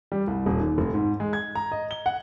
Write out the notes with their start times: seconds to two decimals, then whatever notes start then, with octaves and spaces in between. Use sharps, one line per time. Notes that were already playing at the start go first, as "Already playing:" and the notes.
0.12 G3
0.27 C2
0.46 D#1
0.60 D#2
0.78 F1
0.94 G#2
1.20 G#3
1.33 G#6
1.55 A#5
1.72 D#5
1.91 G7
2.06 F#5